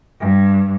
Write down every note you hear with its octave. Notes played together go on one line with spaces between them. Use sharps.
G2